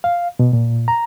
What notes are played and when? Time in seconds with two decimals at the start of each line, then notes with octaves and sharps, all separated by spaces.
0.04 F5
0.39 B2
0.53 A#2
0.88 A#5